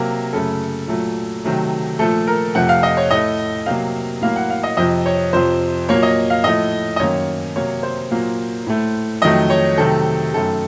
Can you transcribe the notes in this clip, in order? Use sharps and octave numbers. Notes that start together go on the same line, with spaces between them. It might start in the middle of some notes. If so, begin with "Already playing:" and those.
Already playing: C3 F#3 A#3 A#4
F#2 C#3 A3 A4
A#2 F#3 A3
C3 D#3 F#3 A3
A#2 F3 A3 A4
A#4
F2 C3 F3 A3 F#5
F5
D#5
C#5
A2 A3 D#5
C3 F#3 A#3 F5
A2 F#3 A#3 F5
F#5
F5
D#5
F2 C3 F3 D#5
C#5
F2 C3 F3 C5
A#2 F#3 A#3 C#5
D#5
F5
A2 F3 A3 D#5
D#5
F#2 D#3 A#3 C#5
C3 F#3 A#3 C#5
C5
A#2 F#3 A#3
A2 A3
F2 D#3 F#3 A3 D#5
C#5
C3 D#3 F#3 A3 A4
F#2 D#3 A3 A4